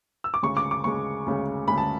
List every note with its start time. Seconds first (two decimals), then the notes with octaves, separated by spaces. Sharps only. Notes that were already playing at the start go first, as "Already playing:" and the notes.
0.24 E6
0.34 D6
0.43 D2 C#3 G#3 C#6
0.57 D6
0.71 D6
0.84 D2 C#3 G#3 C#6
1.26 D2 C#3 G#3
1.68 D2 C#3 G#3 B5
1.78 A5